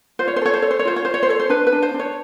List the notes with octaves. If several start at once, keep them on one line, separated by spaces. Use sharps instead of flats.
F4 C5
C#5
C5
A4 C#5
C5
A4 C#5
C5
C#5
F4 C5
C#5
F4 C5
C#5
C5
A4 C#5
C5
D4 B4
B4
D4
C5
D4
C#5